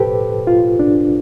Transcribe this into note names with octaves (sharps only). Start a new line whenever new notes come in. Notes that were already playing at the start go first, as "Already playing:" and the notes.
Already playing: A2 G4 A4 B4 C5
F4
D4